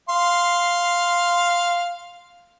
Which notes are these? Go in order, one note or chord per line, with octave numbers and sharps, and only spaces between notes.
F5 C6